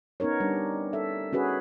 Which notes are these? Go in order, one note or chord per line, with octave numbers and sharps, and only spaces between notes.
B3 C#4 D#4 A#4 C#5
G3 D4
A4 E5
C#4 F#4 G#4 B4